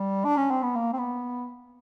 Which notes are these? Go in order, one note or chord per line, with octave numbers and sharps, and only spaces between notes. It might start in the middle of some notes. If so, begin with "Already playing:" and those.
Already playing: G3
D4
C#4
C4
B3
A#3
C4
B3